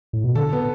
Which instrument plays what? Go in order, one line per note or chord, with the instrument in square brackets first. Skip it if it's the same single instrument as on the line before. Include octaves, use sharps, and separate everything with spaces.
[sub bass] A2
B2
[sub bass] D3 [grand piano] A4
[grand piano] B3